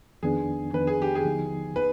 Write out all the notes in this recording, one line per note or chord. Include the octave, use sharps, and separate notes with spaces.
F2 D#3 B3 D4 G#4
F2 D#3 B3 D4 B4
G#4
G4
G#4
D#2 D3 F3 B3 D#4
B3 D#4 B4